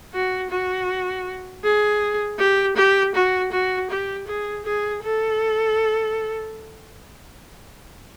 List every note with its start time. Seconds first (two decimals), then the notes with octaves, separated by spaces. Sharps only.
0.14 F#4
0.50 F#4
1.64 G#4
2.39 G4
2.76 G4
3.15 F#4
3.52 F#4
3.90 G4
4.27 G#4
4.65 G#4
5.03 A4